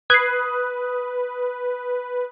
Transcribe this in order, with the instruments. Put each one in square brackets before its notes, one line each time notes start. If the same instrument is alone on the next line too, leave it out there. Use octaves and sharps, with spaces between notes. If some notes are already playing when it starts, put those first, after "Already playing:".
[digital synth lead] B4 [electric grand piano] D#6 F#6 [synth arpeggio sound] G#6 C7